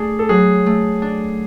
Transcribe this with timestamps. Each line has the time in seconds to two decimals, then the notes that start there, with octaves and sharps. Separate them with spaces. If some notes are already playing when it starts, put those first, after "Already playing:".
Already playing: A3 D4 G#4
0.19 A4
0.29 F#3 G#4
0.66 A3
1.02 D4